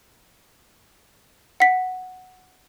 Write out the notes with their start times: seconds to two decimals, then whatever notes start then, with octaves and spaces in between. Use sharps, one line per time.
1.60 F#5 B6